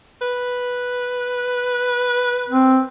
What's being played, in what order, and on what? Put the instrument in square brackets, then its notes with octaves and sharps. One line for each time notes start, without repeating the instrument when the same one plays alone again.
[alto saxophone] B4
[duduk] C4